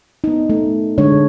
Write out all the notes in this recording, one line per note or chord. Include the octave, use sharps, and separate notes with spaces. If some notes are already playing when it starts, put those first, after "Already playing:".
B3 D#4
A3
D3 G#3 D4 C#5